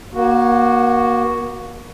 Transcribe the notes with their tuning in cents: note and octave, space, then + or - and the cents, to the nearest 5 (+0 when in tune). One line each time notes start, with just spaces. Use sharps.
A#3 +30 F#4 +0